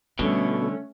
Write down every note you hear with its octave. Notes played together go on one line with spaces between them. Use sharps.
B2 D3 G3 A3 C#4